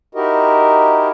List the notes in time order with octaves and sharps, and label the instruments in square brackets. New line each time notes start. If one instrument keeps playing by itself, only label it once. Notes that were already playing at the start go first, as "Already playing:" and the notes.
[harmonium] D#4 E4 F#4 G4 A#4 D#5